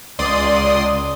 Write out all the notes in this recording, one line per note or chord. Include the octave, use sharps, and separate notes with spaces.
C#2 D5 C6 D#6